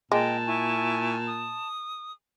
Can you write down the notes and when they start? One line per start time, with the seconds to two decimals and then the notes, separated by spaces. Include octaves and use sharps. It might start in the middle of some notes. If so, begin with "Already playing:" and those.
0.12 A#2 G#3 D#5 G5 A5
0.46 E4 G#5 C#6
1.27 D#6